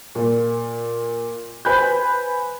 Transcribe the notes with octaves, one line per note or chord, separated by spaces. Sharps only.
A#2
B4 C5 G#5 B5 F#6 G6